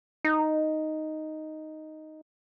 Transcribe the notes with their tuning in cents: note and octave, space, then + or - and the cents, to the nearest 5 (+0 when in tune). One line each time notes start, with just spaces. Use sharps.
D#4 +0